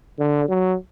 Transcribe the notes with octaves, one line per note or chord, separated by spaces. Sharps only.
D3
F#3